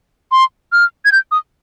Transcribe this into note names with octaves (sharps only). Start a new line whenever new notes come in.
C6
F6
G#6
G6
D#6